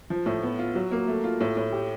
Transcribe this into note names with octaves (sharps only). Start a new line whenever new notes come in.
F3
A2
B3
F4
F#3
A#3
A3
F4
A2
A2
G4